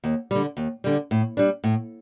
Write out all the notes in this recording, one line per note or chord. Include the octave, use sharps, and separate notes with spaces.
D#2
D3 G3
D#2
D3 G3
A2
G3 D4
A2